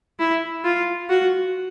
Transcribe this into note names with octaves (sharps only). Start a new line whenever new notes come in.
E4
F4
F#4